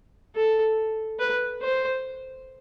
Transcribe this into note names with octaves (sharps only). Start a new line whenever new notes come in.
A4
B4
C5